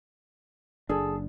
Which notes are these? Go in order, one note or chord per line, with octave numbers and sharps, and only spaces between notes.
F#1 D4 G#4 A4